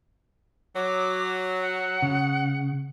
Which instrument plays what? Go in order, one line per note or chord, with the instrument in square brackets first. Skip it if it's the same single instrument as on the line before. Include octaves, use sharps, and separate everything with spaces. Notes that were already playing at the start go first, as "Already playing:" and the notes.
[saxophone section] F#3 [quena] D6
[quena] F#5
[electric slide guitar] C#3